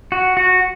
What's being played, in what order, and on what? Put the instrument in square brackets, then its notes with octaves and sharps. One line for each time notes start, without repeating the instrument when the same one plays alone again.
[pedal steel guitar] F#4
F#4